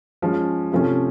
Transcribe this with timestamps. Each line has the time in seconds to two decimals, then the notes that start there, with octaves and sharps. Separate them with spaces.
0.22 F3 G#3 C#4
0.72 C3 F3 A3 C#4